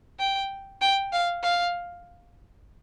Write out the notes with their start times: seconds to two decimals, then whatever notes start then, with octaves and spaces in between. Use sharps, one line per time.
0.19 G5
0.81 G5
1.12 F5
1.43 F5